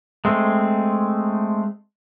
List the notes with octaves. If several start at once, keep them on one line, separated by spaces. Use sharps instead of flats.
G#3 A3 C4